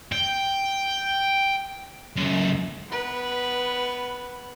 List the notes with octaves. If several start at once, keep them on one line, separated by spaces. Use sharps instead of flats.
G5
C#2 F#2
B3 B4